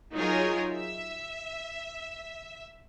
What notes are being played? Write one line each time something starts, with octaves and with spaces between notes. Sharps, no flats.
F#3 D#4 F4 G#4 A#4 C#5
E5